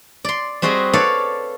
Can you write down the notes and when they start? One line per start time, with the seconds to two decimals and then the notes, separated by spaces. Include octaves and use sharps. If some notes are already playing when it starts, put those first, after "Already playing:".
0.25 D5 C6
0.62 G3 C4 F#4 G#4 D#5
0.94 A4 B4 C#5 D5 F5